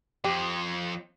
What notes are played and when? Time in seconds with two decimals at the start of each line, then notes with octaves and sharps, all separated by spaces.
0.24 F2 G4